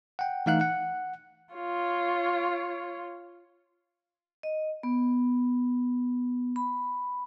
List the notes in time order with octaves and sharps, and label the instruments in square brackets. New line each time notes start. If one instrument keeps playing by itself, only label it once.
[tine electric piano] F#5 G5
E3 A3 D#4 F5 F#5 F#6
F#5
[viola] F4 C#5
[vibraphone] D#5
B3
B5